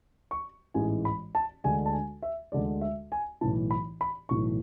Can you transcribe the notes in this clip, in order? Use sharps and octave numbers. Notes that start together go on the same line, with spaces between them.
C#6
A1 G#2 E3 G#3 G#5
B5
A5
D2 D3 G#3 G#5
A5
G#5
E5
D2 D3 G#3 D5
E5
G#5
B1 A2 E3 A5
B5
B5
B1 A2 E3 C#6